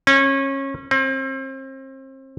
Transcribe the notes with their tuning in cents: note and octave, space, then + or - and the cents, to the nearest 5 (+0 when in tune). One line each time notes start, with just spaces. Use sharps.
C#4 -25
C4 +35